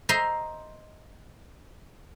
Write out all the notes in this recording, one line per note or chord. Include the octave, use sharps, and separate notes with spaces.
C5 D#5 E5 A#5 C6